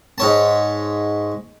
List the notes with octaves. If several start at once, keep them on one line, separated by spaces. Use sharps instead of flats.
G#2 C#5 A5